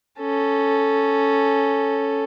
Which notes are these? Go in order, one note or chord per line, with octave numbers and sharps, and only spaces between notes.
C#4 A4